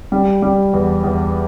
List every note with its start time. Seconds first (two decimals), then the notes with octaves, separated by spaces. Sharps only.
0.12 G3
0.42 G3
0.73 E2
1.04 E2